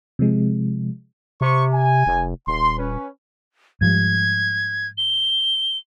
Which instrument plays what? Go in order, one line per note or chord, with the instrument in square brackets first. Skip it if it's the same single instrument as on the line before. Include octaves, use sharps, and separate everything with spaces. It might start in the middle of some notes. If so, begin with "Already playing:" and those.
[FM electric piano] C3 F3 G#3
[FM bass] C3 [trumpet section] C5 C#6
[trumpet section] G#5
[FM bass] F1
[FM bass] D#1 [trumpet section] C6
[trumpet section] C#4 B4
[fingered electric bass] G#2 F3 G3 [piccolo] G#6
[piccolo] G7